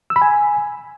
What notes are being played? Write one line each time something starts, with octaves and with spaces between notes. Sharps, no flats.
E6
B5
G#5